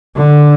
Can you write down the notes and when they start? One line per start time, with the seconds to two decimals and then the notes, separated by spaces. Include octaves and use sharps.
0.16 D3